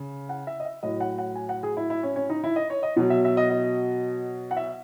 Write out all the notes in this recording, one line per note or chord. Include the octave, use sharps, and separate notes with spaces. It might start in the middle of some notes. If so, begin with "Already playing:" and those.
Already playing: C#3
F#5
E5
D#5
E5
A2 F#3 D#5
F#5
F#5
G#5
F#5
G#4
E4
E4
C#4
C#4
D#4
E4
D#5
C#5
D#5
B2 F#3
E5
E5
D#5
D#5
F#5
E5